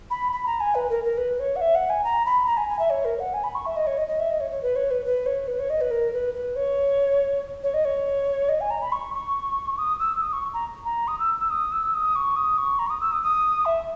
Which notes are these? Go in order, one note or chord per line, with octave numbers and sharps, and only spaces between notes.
B5
B5
A#5
G#5
B4
A#4
A#4
B4
C#5
F#5
E5
F#5
G#5
A#5
B5
A#5
G#5
G#5
E5
C#5
A#4
F#5
G#5
B5
C#6
E5
D#5
C#5
D#5
D#5
E5
D#5
C#5
C#5
B4
C#5
B4
B4
C#5
B4
C#5
D#5
B4
A#4
B4
B4
C#5
C#5
D#5
C#5
D#5
G#5
A#5
B5
C#6
C#6
D#6
E6
D#6
C#6
A#5
A#5
D#6
E6
E6
D#6
E6
D#6
C#6
D#6
C#6
A#5
C#6
D#6
E6
D#6
D#6
E5